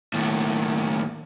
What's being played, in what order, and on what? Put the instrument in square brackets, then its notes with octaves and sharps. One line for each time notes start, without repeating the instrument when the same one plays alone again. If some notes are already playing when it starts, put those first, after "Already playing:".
[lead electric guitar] D#2 A2